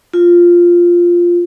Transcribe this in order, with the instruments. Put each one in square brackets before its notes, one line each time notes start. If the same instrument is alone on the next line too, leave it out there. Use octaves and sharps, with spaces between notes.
[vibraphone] F4